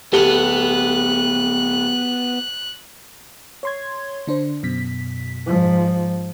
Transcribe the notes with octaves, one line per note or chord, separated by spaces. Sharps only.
D1 B3 G4 A4 F#6 G7
C#5 C6 G#6
D3 D4 C5
F#2 B2 B6
G#2 F3